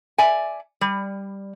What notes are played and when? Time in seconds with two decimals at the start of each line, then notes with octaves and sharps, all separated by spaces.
0.18 D5 E5 G#5
0.81 G3